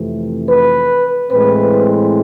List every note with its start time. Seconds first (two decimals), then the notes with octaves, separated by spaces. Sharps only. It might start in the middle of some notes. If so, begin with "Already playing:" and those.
Already playing: F2 C3 E3 A3
0.49 B4
1.31 A2 E3 G#3 C4 B4